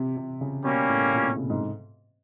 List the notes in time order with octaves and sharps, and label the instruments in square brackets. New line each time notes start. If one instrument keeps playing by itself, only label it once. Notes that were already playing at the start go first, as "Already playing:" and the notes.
Already playing: [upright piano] C3
C3
C#3
[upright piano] B2 [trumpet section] G3 A#3 C#4
[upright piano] A2
A#2
C3
C#3
G#2